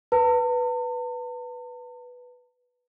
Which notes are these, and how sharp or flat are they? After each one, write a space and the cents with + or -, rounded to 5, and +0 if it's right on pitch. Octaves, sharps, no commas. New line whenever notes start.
B4 +0 A5 +45